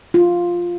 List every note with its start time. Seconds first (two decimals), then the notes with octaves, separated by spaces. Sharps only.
0.14 F4